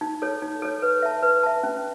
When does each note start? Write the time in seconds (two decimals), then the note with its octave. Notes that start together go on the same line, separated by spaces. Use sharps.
0.01 D#4
0.22 A4 C#5
0.42 D#4
0.62 A4 C#5
0.82 B4
1.03 E5 A5
1.23 B4
1.43 E5 A5
1.63 C#4